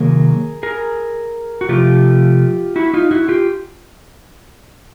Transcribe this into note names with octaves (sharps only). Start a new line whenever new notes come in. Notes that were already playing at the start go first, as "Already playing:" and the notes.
Already playing: C3 D#3 F#3 A#3 G#4 A#4
G#4 A#4
F#4
C3 F3 A3 F4 G4
E4 F#4
D#4 F4
E4 F#4
F4 G4